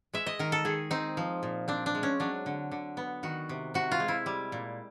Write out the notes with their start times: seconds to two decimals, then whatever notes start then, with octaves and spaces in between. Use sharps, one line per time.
0.13 G#3 E5
0.26 D#5
0.39 D#3 A#4
0.52 A4
0.65 D#3 G#4
0.91 C4 D#4
1.17 F3
1.43 A#2
1.68 C4 D4
1.86 D4
1.95 G#3
2.03 C#4
2.20 F#3 D4
2.46 D3
2.71 D3
2.97 B3
3.23 D#3 F#4
3.49 C3
3.74 C3 F#4
3.91 F4
4.00 G#3
4.08 E4
4.26 G3
4.52 A#2